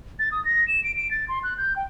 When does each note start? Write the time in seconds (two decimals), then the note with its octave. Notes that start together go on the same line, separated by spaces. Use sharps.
0.19 A6
0.32 D#6
0.45 A#6
0.68 E7
0.84 D7
0.96 D7
1.11 A6
1.28 C6
1.43 F#6
1.58 G6
1.76 G5